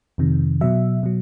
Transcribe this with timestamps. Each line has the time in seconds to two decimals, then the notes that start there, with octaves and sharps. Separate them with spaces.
0.18 F2 C3 D#3
0.61 B2 F#3 E5
1.03 B2 F#3